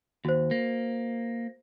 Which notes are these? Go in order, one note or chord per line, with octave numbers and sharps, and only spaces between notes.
D#2 F#4 C5
A#3